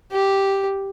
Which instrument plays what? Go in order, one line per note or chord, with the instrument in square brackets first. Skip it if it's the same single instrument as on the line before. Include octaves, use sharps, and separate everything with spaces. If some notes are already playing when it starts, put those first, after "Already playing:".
[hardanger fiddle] G4